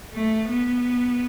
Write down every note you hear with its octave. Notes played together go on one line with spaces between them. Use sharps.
A3
B3